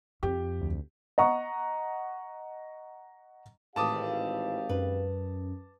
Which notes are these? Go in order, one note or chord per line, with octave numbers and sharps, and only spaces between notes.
F2 G4
D2
D#5 F#5 A#5 C#6
G#1 A2 E3 G4 F5 A5 D6 D#6
F#2 B4